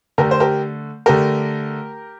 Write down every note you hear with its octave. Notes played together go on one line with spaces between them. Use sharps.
D3 A3 G4 A#4
C5
G4 A#4
D3 A3 G4 A#4